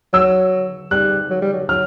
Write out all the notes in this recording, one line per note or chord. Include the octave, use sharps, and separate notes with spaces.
F#3 E6
G3 F#6
F#3
G3
F#3
F#3 F6